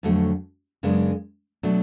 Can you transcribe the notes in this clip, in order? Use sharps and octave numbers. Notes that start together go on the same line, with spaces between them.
F2 D3 F#3 A3
F#2 C#3 G#3 B3 D4
B2 F#3 A3 D4